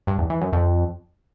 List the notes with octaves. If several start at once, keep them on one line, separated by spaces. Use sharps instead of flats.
G2
E2
E3
F#2
F2